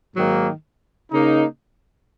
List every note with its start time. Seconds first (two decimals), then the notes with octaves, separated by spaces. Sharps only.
0.15 G#2 D#3 F#3 A#3
1.11 C#3 A#3 D#4